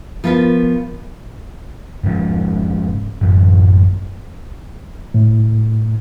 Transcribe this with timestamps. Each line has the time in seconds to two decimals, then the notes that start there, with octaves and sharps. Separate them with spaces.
0.24 F3 B3 F4 A#4 B4
2.03 F1 G#2 C#3 F3
3.21 A1 F#2 F#3
5.14 A2